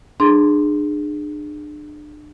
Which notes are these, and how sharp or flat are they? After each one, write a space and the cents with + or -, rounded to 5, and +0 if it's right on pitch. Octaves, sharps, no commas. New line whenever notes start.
D4 +30 G#4 +0 C6 +0